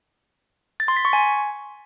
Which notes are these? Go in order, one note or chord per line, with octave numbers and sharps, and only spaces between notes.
A6
C6
B6
C#6
G#5